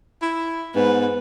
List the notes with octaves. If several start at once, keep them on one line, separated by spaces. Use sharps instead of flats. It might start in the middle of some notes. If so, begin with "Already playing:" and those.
E4
G#2 B3 B4